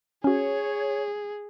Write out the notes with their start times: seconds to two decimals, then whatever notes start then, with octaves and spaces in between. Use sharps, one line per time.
0.24 C#4 F#4 G#4 C#5